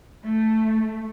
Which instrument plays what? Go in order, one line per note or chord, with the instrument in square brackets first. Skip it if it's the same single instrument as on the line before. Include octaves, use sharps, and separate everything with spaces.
[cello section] A3